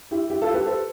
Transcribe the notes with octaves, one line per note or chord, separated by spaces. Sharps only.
E4 G4
E4 G4
F4 A4
G4 B4
A4 C5